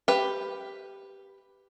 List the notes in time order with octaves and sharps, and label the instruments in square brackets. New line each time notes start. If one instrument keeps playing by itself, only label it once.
[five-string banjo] G4 B4